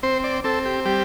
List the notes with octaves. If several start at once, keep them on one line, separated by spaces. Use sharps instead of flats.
C4 C5
D5
C4 A4
G4
G3 G4